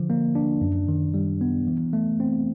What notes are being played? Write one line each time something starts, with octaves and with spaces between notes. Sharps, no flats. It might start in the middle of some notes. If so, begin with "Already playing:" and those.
Already playing: D3 F3
A#3
D4
F#2
D#3
G3
B3
E3
A3
C4